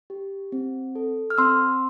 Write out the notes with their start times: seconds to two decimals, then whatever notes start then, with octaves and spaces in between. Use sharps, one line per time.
0.10 G4
0.52 C4
0.95 A4
1.30 F6
1.38 C4 C6 E6